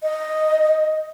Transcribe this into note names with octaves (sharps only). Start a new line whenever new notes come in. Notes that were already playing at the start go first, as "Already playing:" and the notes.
D#5